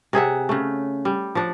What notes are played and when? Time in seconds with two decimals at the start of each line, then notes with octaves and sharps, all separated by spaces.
0.13 C3 G#4 E5 F#5
0.49 C#3 A3
1.05 G3
1.35 F3 D4